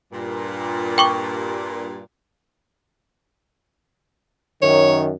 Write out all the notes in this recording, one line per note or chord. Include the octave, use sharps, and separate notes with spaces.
G2 A#2
G5 C#6 D6
F#2 D#3 C#5